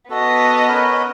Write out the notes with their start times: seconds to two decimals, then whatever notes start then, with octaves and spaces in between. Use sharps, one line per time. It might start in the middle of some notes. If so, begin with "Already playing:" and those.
0.10 B3 F#4 A4 D#5
0.68 C#4 A#4 B4